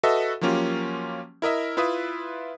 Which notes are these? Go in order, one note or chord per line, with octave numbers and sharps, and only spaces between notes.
F#4 A4 B4 D#5 E5
F3 F#3 A#3 C#4 F4 G4
E4 A#4 D#5 E5
E4 F4 B4 E5 D#6